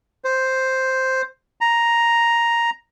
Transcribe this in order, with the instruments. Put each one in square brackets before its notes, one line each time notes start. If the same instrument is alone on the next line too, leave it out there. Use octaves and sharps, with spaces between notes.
[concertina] C5
A#5